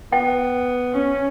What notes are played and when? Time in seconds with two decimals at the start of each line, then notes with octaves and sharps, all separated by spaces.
0.12 B3 G5
0.94 C#4